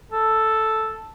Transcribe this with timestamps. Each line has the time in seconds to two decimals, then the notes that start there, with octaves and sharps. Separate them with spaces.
0.12 A4